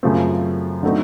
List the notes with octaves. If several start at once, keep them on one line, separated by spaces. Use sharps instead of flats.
F#2 C#3 F3 A3 C4
D3 F#3 A3 C4 D#4